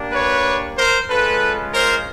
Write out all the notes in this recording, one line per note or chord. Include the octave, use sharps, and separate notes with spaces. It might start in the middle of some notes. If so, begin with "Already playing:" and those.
Already playing: A#3 D4 G4
B4 C#5
A#4 C5
G#3 C#4 F4 A4 B4
A#4 C5